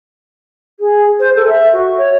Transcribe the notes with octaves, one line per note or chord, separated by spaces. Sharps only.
G#4
C5
A4
E5
F#4
C#5